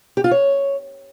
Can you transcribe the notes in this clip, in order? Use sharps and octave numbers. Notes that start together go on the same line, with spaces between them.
G4
F4
C#5